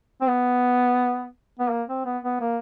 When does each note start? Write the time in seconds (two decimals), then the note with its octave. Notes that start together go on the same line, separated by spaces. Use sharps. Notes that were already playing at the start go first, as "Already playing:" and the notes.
0.21 C4
0.27 B3
1.59 B3
1.70 A#3
1.88 C4
2.05 B3
2.24 B3
2.41 A#3